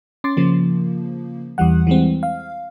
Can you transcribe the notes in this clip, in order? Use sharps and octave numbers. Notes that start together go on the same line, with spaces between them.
C#4 C6 D6 A6
C#3 F3 A#3
E2 E3 G3 F#5
E3 G3 G#3 C4
F5